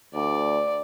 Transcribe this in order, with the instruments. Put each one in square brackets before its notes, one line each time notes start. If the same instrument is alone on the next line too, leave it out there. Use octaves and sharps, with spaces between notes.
[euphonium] D2 [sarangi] D5